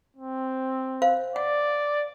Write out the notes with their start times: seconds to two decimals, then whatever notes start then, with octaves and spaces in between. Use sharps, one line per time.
0.16 C4
1.02 C5 F5
1.36 D5 F#5